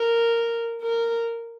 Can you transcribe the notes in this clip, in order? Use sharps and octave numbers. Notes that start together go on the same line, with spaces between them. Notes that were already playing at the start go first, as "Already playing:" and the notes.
Already playing: A#4
A#4